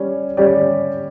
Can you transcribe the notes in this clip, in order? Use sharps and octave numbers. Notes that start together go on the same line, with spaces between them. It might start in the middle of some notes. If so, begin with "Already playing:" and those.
Already playing: G3 C#4
G3 C#4 G4 D5